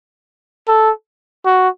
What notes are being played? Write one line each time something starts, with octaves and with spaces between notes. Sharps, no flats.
A4
F#4